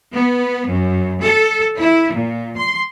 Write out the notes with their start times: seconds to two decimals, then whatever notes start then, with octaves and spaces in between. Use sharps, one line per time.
0.13 B3
0.70 F#2
1.22 A4
1.77 E4
2.13 A#2
2.57 C6